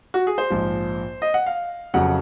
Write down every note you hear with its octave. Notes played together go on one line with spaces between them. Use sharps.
F#4
G#4
C5
A#1 G#2 F3
D#5
F#5
F5
F1 F2 C#3 F#3 F#5